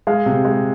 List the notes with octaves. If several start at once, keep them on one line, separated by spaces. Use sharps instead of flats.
G#3 F5
C3
G#3